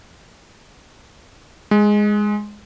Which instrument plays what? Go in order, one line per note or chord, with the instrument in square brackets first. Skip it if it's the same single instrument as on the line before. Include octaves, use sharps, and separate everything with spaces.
[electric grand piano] G#3